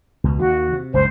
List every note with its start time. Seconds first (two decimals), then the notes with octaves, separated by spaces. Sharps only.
0.24 C#2 B2
0.39 D#2 D#3 F#4
0.72 C3
0.94 F#1 C#2 G2 C5